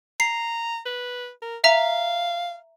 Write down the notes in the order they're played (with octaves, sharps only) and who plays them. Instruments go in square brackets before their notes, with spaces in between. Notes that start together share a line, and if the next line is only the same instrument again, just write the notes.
[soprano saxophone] A#5 [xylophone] C7
[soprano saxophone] B4
A#4
[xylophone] E5 A#5 [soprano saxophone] F5